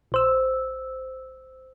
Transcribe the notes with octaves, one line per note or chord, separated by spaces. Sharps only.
A#1 C5 E6